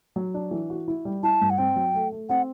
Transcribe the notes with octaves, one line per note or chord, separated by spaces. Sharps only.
F#3
D4
E3
F#4
E4
G3
E4 A5
G2
F#5
C4 G5
F#3
A3
A3
C4 F#5